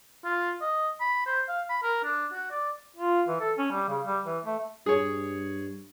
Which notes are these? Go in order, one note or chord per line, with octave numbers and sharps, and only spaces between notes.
F4
D#5
B5
C5
F5
B5
A#4
D4
F#4
D5
F4
E3
A4
C#4
G3
C#3
G3
E3
A3
G2 G#4 C#5